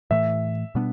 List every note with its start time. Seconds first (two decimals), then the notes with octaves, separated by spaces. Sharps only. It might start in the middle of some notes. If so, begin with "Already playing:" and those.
0.11 A2 E3 A3 E5
0.75 B2 G3 B3 D4